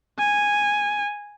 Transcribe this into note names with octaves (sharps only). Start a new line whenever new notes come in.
G#5